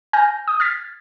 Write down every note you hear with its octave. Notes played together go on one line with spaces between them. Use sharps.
G#5 F6 G6 A#6
D#6 G6
F6 G#6 A6 B6